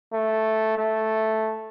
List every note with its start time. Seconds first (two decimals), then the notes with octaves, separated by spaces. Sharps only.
0.13 A3
0.77 A3